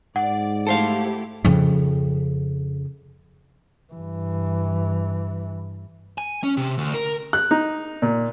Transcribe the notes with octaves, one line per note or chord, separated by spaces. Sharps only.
G#2 D5 F#5
A3 E4 G4 A4 C5 F5
F2 C#3
G2 E3
G#5
C#4
C3
D2
A#4
F#6
D#4
A#2